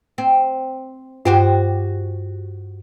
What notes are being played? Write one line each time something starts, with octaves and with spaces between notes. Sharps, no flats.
C4
G2 F#4 G4 C5